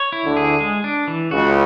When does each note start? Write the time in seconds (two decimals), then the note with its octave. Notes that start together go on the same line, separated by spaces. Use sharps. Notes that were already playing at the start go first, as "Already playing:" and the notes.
Already playing: C#5
0.12 E4
0.24 D2 D3
0.37 G#4
0.61 G#3
0.84 D4
1.08 E3
1.31 C#2 C#3 F#4